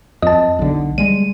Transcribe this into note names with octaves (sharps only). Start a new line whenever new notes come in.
F2 D#5 A5
B1 D3
G3 G#3 D#7